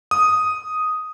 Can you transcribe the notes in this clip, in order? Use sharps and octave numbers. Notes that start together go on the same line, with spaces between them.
D#6